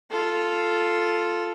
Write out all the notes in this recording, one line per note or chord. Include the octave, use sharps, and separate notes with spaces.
F4 A4